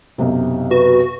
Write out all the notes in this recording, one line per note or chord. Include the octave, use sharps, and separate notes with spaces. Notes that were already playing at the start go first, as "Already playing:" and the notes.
B1 F#2 C3
F#4 B4